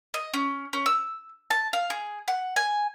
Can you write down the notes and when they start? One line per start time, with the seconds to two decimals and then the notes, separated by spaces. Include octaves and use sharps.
0.14 D#5
0.34 C#4
0.73 C#4
0.86 E6
1.50 A5
1.73 F5
1.90 G#4
2.28 F#5
2.56 G#5